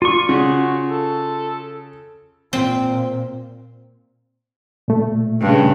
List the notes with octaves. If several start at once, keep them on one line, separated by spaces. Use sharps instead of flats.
F4 D5 C#6
C#3 F#4
A4
A#2 C4
A#2 A3
G2 C#3